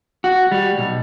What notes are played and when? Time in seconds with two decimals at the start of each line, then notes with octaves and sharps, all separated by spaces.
0.24 F#4
0.52 G3
0.78 B1